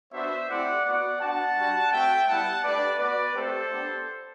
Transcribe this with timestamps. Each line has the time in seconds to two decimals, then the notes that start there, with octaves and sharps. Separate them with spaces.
0.13 B3 D4 F#4 C5 E5
0.49 A3 C4 E4 G4 D5 F#5
0.85 B3 F#4 D5 F#5
1.21 B3 D4 F#4 F#5 A5
1.56 G3 D4 F#4
1.92 A3 C4 F#4 E5 G5
2.28 G3 B3 E4 F#5 A5
2.64 A3 D4 G4 B4 D5
2.99 B3 F#4 B4 D5
3.35 A3 C4 G4 A4 C5
3.71 B3 D4 G4